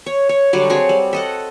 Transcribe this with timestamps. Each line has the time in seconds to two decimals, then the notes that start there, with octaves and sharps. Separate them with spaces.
0.06 C#5
0.29 C#5
0.53 D3 F#3 G3
0.70 F#3 C4 G#4 C#5
0.89 G3
1.13 A4 D#5 F#5